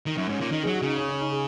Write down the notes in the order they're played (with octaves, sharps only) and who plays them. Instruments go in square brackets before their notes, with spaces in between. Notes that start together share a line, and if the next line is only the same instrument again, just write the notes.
[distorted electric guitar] D#3 [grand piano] D#4
[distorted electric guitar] F#2
[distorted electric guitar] G#2 [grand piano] C#4
[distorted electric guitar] A#2
[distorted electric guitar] D#3 [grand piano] D#4
[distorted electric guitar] F#3 [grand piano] G#4
[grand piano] F#4
[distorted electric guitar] C#3 [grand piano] D#4
[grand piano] C#4
C#4
D#4
G#4